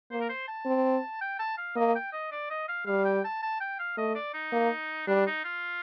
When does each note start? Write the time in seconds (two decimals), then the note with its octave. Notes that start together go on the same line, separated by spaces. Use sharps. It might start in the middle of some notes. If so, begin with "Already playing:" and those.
0.11 A#3 C5
0.21 A#4
0.29 C5
0.48 A5
0.66 C4
1.21 G5
1.39 A5
1.57 F5
1.76 A#3 D#5
1.95 G5
2.13 D#5
2.32 D5
2.50 D#5
2.68 F5
2.86 G3 F5
3.05 G5
3.24 A5
3.42 A5
3.60 G5
3.79 F5
3.97 A3 D#5
4.15 D5
4.34 D#4
4.53 A#3
5.07 G3 D4
5.27 D#4
5.44 F4